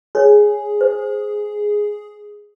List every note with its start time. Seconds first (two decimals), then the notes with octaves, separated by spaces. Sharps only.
0.15 G#4 C#5
0.81 C5